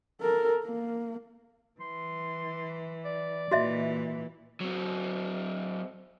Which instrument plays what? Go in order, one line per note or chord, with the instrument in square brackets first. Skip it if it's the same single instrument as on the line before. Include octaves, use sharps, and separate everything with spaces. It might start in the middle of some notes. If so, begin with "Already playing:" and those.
[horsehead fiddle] A4 A#4
A#3
[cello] E3 [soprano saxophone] C6
[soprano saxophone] D5
[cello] A#2 E3 [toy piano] F#4 D#5 E5
[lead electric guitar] F#3 C4